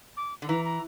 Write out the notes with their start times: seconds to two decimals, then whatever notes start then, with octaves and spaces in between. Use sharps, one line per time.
0.17 D6
0.42 D3
0.48 E3 A#5
0.65 A#5